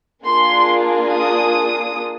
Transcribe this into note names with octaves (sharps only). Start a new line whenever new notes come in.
A#3 D4 F4 G#4 C6
D#6